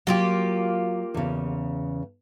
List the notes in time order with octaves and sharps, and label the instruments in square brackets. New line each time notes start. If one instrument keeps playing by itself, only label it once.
[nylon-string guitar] F#3 [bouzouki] A#3 F4 G4
[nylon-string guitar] E2 C#3